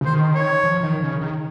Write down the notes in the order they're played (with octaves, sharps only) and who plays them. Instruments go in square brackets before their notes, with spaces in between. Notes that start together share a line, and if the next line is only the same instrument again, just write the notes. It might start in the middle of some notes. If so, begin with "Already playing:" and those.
[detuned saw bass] C#3
[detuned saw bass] D#3 [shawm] C5
[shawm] C#5
[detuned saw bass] F3
D#3
C#3
D#3